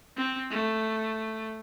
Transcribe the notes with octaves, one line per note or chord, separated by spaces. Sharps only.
C4
A3